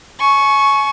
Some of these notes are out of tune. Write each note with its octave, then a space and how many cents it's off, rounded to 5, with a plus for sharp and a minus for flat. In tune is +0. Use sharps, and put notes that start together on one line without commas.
G#5 +40 C#6 +0